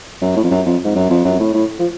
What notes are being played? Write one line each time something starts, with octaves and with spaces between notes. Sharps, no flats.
F#2
A2
F2
F#2
F2
G#2
F#2
F2
F#2
A2
A2
F3